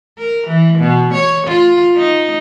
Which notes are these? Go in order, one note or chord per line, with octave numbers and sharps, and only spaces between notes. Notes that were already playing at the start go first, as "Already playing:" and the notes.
A#4
E3
B2
C#5
F4
D#4